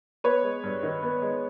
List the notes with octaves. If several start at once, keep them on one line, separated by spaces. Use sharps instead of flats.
B3 B4 C#5
G#3
G2
D#3
B3
G#3